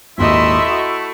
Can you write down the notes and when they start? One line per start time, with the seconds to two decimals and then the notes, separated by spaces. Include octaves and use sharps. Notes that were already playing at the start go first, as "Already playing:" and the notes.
0.18 G#1 D#2 A#2 A3 E4 D#5 E5 C6
0.67 F#4